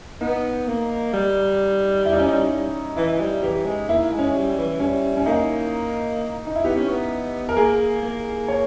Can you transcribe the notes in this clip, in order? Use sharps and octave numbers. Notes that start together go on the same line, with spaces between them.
B3 D#4
A#3
G3
E4
D#4
C#4
D#4
E3 E4
G3
E3 G4
G#3
A#3 E4
G#3
C#4
G3
E3
G3 C#4
C#4
A#3 D#4
D#4
E4
B3 G4
C#4
B3
A#4
A#3 G#4
A#3
C#5